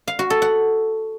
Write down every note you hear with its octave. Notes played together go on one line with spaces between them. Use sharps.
F5
F#4
A4
F#5